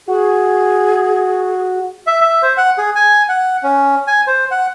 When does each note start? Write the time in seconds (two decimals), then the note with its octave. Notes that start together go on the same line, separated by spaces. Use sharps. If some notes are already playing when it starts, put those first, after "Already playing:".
0.08 F#4 G#4
2.07 E5
2.22 E5
2.43 C5
2.58 F#5
2.78 G#4
2.95 G#5
3.29 F#5
3.63 C#4
4.07 G#5
4.27 C5
4.51 F#5